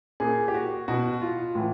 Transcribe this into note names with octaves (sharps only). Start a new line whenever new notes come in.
A#2 G#4
G4
F#4
B2 F#4
F4
A2 E3